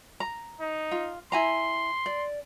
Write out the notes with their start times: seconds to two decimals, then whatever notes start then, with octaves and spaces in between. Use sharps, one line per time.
0.20 A#5
0.60 D#4
0.91 F4
1.32 E4 G#5 A#5 C6
2.06 D5